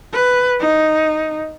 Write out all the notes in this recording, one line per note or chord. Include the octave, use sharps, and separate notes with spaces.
B4
D#4